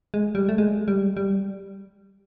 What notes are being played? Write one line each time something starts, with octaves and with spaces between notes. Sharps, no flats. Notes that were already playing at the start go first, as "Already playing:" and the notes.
G#3
G3
A3
G#3
G3
G3